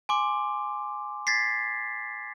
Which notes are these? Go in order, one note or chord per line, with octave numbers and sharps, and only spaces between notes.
G#5 C6 D6
G#6 A6 B6 C7